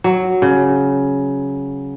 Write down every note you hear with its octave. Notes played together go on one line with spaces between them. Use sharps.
F#3
C#3